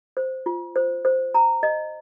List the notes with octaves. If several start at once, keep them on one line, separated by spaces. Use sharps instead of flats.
C5
F4
C5
C5
A#5
D#5